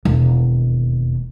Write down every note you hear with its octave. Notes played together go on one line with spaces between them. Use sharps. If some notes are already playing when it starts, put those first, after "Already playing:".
E1 D#2